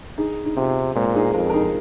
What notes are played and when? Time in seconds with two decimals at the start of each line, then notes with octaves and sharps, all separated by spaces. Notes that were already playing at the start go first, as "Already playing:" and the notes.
0.18 D#4 G#4
0.45 D#4
0.57 C3 C4 F4
0.95 A#2 G#3 C4
1.15 D#4 G#4
1.34 F2 F4 A#4
1.49 A#4
1.54 D#4 G#4